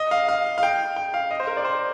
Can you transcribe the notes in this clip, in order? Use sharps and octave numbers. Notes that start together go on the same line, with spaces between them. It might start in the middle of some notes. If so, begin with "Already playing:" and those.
Already playing: D#5
F5
F5
F5
G5
G5
F5
D#5
C5
A#4
D5
C5